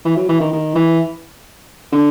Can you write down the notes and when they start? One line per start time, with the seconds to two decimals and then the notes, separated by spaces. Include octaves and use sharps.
0.05 E3
0.17 F#3
0.29 E3
0.40 D#3
0.52 D#3
0.75 E3
1.92 D3